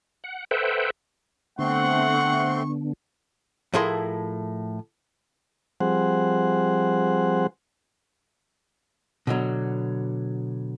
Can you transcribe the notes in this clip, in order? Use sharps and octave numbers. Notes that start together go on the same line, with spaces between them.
F#5
A4 B4 C5 E5 F#5 G5
D3 A3 B3 C4 D4 F#5 C6 C#6
A2 F3 E4 G#4 A#4 C6
F3 G3 C4 G#4 C5 F#5
B2 D3 F#3